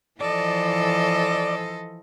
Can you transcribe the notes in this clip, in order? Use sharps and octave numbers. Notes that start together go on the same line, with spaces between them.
E3 F3 A4 C5 D5 D#5